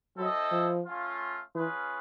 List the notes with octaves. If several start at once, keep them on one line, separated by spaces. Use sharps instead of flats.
F#3 C4 E4 A4 C5 D#5
F3
A3 C#4 F4
E3 C#4 F4 G#4 B4